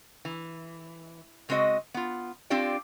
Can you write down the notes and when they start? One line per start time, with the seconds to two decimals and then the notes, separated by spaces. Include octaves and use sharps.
0.25 E3
1.49 C#3 G#3 C4 F#4 D#5
1.94 B3 F4
2.50 C4 D4 F4 G4 D5